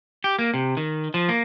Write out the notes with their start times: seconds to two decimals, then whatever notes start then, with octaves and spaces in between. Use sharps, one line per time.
0.24 G4
0.39 A#3
0.54 C3
0.77 D#3
1.14 F3
1.29 A#3